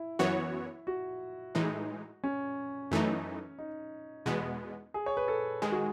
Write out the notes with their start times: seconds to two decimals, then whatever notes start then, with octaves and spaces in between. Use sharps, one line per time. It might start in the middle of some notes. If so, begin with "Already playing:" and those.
Already playing: E4
0.19 F#2 E3 B3 F#4 C#5
0.87 F#4
1.55 A2 E3 G#3 D#4
2.24 C#4
2.91 F#2 E3 A3 D#4
3.59 D#4
4.26 E2 B2 G#3 B3
4.94 G#4
5.06 C#5
5.17 B4
5.28 A4
5.62 D#3 G#3 G#4
5.71 F#4